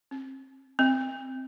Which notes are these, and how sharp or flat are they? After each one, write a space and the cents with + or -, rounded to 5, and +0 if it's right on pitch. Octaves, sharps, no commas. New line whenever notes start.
C4 +40
C4 +0